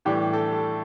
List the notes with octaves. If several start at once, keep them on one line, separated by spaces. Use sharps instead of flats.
A2 E3 G3 D4 G4
A4